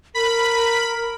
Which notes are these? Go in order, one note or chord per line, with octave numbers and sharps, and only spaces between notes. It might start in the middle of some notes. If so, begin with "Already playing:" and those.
A#4 B5